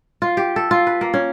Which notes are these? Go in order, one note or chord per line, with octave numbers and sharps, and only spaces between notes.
F4
G4
A4
F4
B4
A#3
C#4